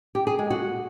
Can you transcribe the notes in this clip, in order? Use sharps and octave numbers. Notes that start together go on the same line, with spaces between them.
G4
G#4
G#3
F#4